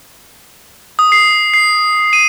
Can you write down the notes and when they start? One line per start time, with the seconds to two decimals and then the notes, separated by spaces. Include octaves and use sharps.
0.99 D#6
1.12 C7
1.54 C7
2.13 D#7